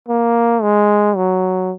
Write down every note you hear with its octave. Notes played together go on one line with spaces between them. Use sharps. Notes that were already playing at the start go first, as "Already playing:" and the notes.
A#3
G#3
F#3